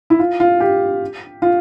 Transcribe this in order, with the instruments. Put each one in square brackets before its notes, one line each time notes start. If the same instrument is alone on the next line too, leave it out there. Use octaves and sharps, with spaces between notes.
[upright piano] E4
F4
F4
G4
F4